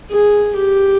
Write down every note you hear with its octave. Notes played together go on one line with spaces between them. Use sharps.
G#4
G4